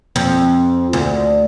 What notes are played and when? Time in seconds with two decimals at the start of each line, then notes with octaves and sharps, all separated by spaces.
0.16 F2
0.93 D2